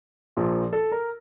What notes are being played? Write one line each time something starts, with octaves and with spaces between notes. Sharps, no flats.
A#1 A#2 F3
A4
A#4